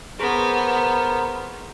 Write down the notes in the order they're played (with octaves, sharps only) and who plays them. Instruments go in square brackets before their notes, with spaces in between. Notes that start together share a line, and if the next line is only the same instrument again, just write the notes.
[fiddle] B3 [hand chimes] G#4 C#6 B6 [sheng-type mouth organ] A#4 C5